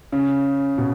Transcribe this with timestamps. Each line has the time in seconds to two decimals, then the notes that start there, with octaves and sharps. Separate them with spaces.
0.12 C#3
0.78 B2